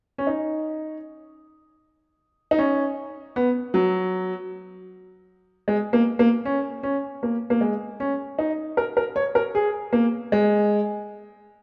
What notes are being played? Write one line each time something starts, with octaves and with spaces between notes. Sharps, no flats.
C#4
D#4
D#4
C#4
B3
F#3
G#3
A#3
A#3
C#4
C#4
A#3
A#3
G#3
C#4
D#4
A#4
A#4
C#5
A#4
G#4
A#3
G#3